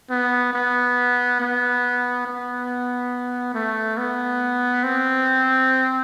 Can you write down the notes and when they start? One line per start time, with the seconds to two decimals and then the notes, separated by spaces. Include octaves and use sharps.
0.10 B3
0.54 B3
1.40 B3
2.26 B3
3.54 A3
3.98 B3
4.84 C4